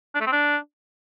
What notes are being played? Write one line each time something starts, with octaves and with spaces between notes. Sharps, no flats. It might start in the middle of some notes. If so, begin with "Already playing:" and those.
D4
A3
C4
D4